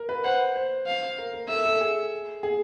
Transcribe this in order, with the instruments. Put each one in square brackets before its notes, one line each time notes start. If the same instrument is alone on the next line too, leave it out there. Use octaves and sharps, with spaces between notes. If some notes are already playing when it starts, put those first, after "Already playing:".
Already playing: [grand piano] A#4
B4
[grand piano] C5 [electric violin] F#5
[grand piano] C5
[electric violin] F5
[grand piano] A#4
A#4
[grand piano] A4 [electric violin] E5
[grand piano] A4
G#4
G#4